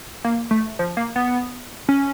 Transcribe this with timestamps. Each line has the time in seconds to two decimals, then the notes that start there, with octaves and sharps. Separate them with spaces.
0.24 A#3
0.51 A3
0.79 F3
0.97 A#3
1.16 B3
1.89 C#4